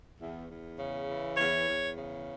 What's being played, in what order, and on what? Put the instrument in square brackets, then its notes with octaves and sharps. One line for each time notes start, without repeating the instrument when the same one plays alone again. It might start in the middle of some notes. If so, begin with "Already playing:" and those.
[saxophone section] E2
E2
C#3
E3
E2 C#5
E2
C#3